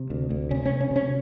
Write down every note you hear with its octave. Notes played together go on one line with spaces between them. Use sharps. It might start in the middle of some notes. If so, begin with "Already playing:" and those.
Already playing: C3
D2
D2
C3 C#4
C#4
D2
C#4
C3 C#4